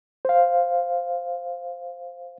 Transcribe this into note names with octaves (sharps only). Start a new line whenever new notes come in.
C5 F5